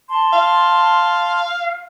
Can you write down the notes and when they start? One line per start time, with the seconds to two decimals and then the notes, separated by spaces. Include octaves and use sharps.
0.08 A5 C6
0.33 F5